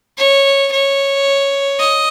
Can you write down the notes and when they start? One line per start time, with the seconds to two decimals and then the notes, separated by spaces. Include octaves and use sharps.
0.18 C#5
0.72 C#5
1.80 D#5